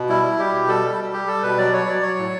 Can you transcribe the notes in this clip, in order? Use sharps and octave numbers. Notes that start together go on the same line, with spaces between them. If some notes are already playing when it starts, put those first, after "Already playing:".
Already playing: B2
G3 E4
G3
G3 G4
B2
G3 A4
G3
G3
G3 G4
G3 A4
B2 B4
F#3 D5
F#3 C#5
F#3 D5
F#3 C#5
A2